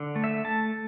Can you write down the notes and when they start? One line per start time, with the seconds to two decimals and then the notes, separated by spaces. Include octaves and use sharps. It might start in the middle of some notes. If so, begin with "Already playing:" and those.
Already playing: D3
0.16 A3
0.24 E5
0.45 A3 A5